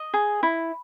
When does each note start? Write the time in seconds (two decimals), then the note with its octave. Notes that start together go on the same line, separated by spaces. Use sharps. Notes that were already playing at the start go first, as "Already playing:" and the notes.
Already playing: D#5
0.14 G#4
0.43 E4